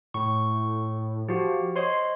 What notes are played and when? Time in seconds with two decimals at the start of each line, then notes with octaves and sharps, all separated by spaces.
0.14 A2 C#6
1.29 F3 F#4 G4
1.76 C5 C#5 D#5 C6